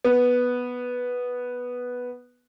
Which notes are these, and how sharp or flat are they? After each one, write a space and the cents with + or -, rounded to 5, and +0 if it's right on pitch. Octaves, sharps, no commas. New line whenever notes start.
B3 -5